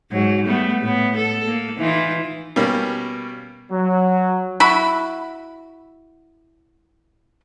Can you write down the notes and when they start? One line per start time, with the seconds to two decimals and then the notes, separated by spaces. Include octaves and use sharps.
0.11 G#2 F#3
0.45 G3 A3 B3
0.82 A2 B3
1.17 A4
1.48 A#3
1.79 E3 D#4 F4
2.56 B2 G3 A#3 C#4
3.71 F#3
4.60 E4 F#4 B5